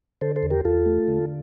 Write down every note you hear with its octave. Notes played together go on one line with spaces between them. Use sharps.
D3 A4 C5
A4 C5
E2
G4 A#4
E2 F4 A4
A3
D3